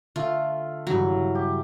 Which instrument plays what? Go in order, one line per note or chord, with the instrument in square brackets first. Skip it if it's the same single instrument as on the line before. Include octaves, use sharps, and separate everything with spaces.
[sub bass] D3 [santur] A3 F5 [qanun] F4
[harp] G2 C#3 E3 [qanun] F#3
[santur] G4